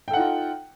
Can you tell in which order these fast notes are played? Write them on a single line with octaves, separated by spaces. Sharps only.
G5 A4 F#5 D#4 F4